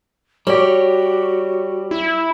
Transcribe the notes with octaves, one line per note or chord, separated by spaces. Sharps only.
G3 F#4 G4 C#5
E4